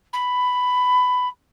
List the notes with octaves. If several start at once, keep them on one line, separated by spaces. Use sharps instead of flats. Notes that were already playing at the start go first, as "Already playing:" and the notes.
B5